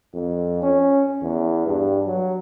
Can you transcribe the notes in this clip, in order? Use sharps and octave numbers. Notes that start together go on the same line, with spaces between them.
F2
C#4
E2
G2
F#3